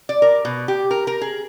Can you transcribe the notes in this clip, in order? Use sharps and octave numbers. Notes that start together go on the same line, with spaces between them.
D5
A#4
B2
G4
A#4
A#4
G#4